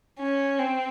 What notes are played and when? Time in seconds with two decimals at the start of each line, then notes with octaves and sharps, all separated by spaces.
0.19 C#4
0.59 C4